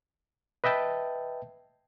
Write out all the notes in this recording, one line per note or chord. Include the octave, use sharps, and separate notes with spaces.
B4 D#5 E5 G5 A5